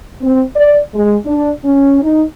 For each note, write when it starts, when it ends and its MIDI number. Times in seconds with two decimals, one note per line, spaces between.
0.21 0.42 60
0.55 0.79 74
0.94 1.16 56
1.26 1.50 62
1.64 2.02 61
2.02 2.22 63